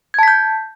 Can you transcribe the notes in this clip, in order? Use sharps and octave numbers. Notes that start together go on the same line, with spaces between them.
A5 G6 G#6 B6